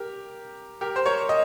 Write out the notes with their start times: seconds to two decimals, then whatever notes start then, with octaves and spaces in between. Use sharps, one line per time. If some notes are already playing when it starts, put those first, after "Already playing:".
Already playing: G4 A#4
0.81 G4 A#4
0.96 C5
1.06 A#4 C#5
1.29 D#5